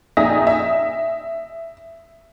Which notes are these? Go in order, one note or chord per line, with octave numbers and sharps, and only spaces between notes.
A#1 D#4 E5 G#5 D#6 A#6
E5